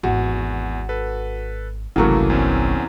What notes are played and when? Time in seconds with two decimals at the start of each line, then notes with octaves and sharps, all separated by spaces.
0.03 G#1 E2 F#4
0.89 A4 B4
1.96 G1 C2 C#3 E3 F#3 A3 A#3 C#6
2.30 E2 C4 C#4